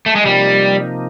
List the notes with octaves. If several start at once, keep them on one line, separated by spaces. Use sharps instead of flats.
A3
G#3
C3 F3 G3 A#3 D#4